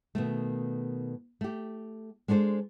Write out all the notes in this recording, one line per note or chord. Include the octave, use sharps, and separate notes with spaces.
B2 D#3 A3
A3 G4
G#3 D4 A4 B4 C5